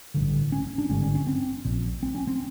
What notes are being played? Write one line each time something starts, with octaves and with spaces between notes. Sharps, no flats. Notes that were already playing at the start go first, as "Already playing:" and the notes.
A1 G2 D3
C#4
D4
G#1 G2 D3 C#4
C#4
C#4
C4
A#1 A#2
C4
C#4
C4